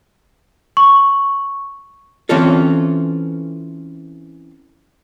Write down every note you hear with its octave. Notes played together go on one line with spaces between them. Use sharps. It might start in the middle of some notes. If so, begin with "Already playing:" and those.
C#6
E3 C4 C#4 F4 A4